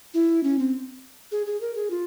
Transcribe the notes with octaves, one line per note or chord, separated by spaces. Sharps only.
E4
C#4
C4
G#4
G#4
A#4
G#4
F4